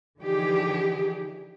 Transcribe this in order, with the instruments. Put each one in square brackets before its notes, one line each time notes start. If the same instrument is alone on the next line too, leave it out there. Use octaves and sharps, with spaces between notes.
[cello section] D3 E3 F3 D#4 G4 G#4